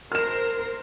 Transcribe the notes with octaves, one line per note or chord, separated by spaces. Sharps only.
A#4 C5 F6 E7